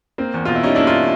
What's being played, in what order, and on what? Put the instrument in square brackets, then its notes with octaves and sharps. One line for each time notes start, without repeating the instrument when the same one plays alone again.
[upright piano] A#3 C4
E2
B2 F4
E4
G3 C#4 D#4
D4 E4
A#3
D#4 F4